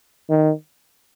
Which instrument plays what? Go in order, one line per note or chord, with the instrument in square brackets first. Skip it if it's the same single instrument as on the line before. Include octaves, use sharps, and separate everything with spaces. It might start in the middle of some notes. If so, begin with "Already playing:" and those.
[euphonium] D#3